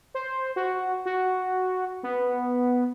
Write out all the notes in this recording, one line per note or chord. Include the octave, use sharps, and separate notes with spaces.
C5
F#4
F#4
B3